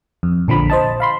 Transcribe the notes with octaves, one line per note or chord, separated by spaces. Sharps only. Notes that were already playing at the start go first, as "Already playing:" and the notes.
F2
A#1 D3 F3 B5
C5 D#5 A5
F5 B5 C6